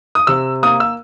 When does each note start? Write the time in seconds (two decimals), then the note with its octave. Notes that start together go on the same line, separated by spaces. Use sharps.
0.15 D#6
0.27 C3 E6
0.63 A#3 D#6
0.80 E6